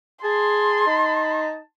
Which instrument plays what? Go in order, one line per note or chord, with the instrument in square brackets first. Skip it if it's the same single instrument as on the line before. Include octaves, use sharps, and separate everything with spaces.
[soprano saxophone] G#4 [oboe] A5 [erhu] C6
[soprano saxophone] D#4